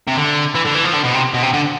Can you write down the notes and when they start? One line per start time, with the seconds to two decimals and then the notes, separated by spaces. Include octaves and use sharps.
0.08 C3
0.16 D3
0.55 E3
0.66 D3
0.75 E3
0.85 F3
0.94 D3
1.04 B2
1.14 C3
1.34 B2
1.43 C3
1.54 D3